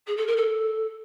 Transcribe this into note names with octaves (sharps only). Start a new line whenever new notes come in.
G#4
A4
A#4
A4